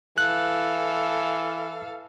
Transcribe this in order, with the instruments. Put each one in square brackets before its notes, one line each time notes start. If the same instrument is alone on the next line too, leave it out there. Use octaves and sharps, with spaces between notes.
[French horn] E3 [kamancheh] A4 F5 [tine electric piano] F#6